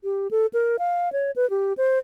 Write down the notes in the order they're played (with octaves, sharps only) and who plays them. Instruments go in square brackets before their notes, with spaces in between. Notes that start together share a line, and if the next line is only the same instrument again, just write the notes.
[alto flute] G4
A4
A#4
F5
C#5
B4
G4
C5